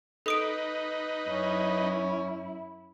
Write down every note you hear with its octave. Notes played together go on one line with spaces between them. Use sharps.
D#4 A4 B4 D#6 D7
F#2 C#4 E4